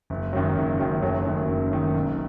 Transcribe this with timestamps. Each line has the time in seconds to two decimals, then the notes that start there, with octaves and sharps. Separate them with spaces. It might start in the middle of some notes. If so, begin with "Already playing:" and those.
0.10 F#1
0.33 F#2 D#3 F#3
0.56 F#1
0.80 F#2 D#3 F#3
1.02 F#1 F#3 A3
1.25 F#2 D#3
1.48 F#1
1.71 F#2 D#3
1.94 B1